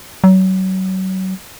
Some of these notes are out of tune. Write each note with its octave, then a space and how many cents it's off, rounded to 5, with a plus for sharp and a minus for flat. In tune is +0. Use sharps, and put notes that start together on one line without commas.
F#3 +30